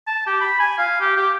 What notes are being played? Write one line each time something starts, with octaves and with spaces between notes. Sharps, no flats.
A5
G4
B5
G#5
F5
G4
G4